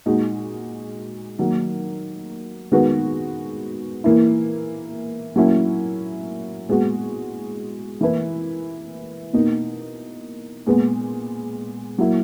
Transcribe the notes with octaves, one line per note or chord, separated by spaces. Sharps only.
A#2 G#3 D#4 F#4
D#3 F#3 A#3 D#4
D#3 G#3 B3 F#4 B4
E3 A#3 E4
F#3 A#3 C#4 E4
A#2 G#3 B3 F#4
E3 A#3 E4 B4
B2 A#3 D#4
A#2 G#3 B3
F#3 A#3 E4